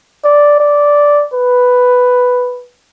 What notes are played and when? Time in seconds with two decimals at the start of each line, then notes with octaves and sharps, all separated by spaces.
0.24 D5
0.60 D5
1.33 B4